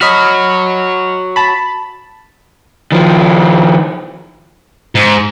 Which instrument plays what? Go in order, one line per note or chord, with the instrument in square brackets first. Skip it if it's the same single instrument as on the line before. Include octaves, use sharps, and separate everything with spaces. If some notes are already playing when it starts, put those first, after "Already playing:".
[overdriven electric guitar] F#4 C#5 [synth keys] D#5 B5 F6
[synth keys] A5 B5
[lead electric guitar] D#3 F3
[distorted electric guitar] G#2